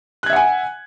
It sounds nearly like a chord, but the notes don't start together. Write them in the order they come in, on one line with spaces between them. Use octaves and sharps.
F#6 G#6 E5 F#5 G#5